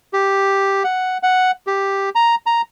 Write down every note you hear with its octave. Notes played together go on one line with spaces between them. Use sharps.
G4
F#5
F#5
G4
A#5
A#5